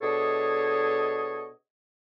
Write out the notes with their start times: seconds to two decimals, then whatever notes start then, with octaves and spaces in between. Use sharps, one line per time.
0.01 B2 D4 G#4 A4 C#5 D#5